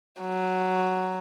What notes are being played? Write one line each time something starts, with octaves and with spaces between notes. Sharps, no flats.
F#3